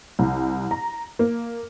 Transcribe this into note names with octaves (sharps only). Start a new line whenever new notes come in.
C2
A#5
A#3